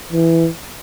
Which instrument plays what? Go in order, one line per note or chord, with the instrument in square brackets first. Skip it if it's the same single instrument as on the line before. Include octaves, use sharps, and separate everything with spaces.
[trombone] E3